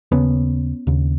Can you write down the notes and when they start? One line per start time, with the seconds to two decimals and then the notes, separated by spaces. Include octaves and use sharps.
0.11 D#2 C#3 B3 C#4
0.87 D#2 C#3